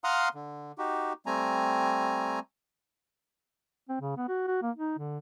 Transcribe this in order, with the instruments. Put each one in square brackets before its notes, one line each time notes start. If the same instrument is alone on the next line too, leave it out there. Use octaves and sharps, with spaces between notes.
[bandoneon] F5 F#5 A#5 C6 D#6 F6
D3
D#4 F#4 G4
G3 A3 C4 G#5 A#5
[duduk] C4
C#3
B3
F#4
F#4
A#3
D#4
D3